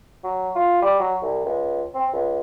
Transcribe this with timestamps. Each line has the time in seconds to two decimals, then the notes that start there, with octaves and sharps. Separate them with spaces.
0.24 F#3
0.55 F4
0.82 G3
1.00 F#3
1.22 C2
1.45 C#2
1.95 C4
2.13 C#2